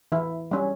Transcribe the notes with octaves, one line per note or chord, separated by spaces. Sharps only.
E3 E4
G3 C#4